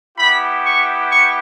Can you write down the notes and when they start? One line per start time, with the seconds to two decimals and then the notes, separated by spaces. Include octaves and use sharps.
0.17 B3 E4 G4 B5
0.64 C#6
1.10 C#6